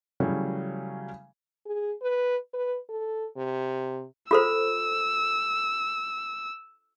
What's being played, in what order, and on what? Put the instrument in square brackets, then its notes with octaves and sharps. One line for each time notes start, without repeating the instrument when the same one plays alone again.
[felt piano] C#3 E3 F#3 G3 A3 C#4
[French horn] G#4
B4
B4
A4
C3
[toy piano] F4 A4 C5 [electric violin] E6